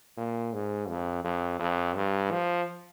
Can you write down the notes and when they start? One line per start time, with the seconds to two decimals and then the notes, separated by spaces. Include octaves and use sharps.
0.17 A#2
0.53 G#2
0.89 F2
1.24 F2
1.60 F2
1.96 G2
2.31 F3